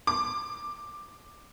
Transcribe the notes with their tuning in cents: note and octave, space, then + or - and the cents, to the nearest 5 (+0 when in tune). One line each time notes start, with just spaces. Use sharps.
D6 +10